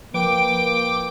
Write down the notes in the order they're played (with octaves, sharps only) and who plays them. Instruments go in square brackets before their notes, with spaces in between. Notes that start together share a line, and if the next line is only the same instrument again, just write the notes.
[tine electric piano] F3 B4 [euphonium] A#3 [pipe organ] G5 D6 [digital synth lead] D7